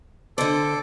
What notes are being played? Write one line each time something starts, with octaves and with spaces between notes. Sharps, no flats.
D3 A4 C5 D6